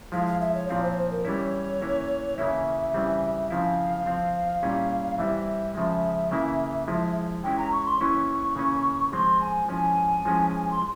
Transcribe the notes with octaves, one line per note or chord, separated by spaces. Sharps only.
F3 G#3 E4 F5
F5
E5
C#5
A#2 F3 C4 E4 F5
C5
C#5
C5
A#4
E3 G3 C#4 E4 C#5
E3 A#3 C#4 E4
C#3 E3 A#3 C#4 E4 E5
C#3 E3 G3 C4
C#3 F3 C4 E4 F5
F3 C4 E4
A#2 G3 C#4 E4
E3 G3 C4 E4 E5
C#3 F3 G#3
C#3 E3 A#3 E4
F3 G#3 E4
E3 G#3 C#4 E4 G5
A#5
C#6
C6
E3 A#3 C#4 E4 C#6
C#3 E3 A#3 C#4
F3 G#3 C4 C6
G#5
F3 G#3 C#4 E4 G#5
F3 G#3 C#4 E4
C6